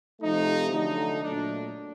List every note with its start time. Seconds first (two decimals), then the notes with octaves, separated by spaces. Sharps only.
0.21 C3 F3 A3 D#4
0.71 D3 F#3 A3 D#4
1.22 A#2 F#3 A3 D4